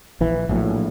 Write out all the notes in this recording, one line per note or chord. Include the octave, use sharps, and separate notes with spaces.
A#1 E3
A#1 A2 F#3